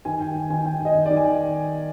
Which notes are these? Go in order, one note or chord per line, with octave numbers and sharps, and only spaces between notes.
D#3 G#5
D#3 G5
D#3
D#3 G#5
D#3 G5
D#3 D#5
D#3
D#3 D5
G#5